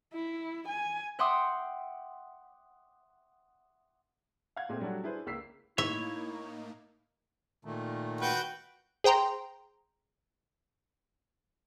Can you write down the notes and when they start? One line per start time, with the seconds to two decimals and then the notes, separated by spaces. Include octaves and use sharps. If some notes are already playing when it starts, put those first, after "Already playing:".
0.13 E4
0.68 G#5
1.19 E5 F#5 G5 C6 D6 D#6
4.56 F5 F#5 G#6
4.69 A#2 G#3 A3 C4
4.80 F#3 G3 A3 D4 F#4
5.03 D4 E4 G#4 B4 C5
5.26 C#2 A#3 E6 B6 C7
5.78 A2 A#3 D#4 E4 C#5 E5
7.65 A#2 D#3 A3
8.21 F#4 B4 G5
9.04 G#4 C5 G5 A#5 C6